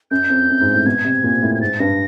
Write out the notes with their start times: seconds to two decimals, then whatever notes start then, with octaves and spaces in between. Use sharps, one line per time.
0.11 F#2 G6
0.30 F2
0.49 F#2
0.61 G#2
0.74 A2
0.86 B2 G#6
1.04 C3
1.24 A#2
1.43 A2
1.55 G#6
1.61 G#2 A6
1.79 G2 A#6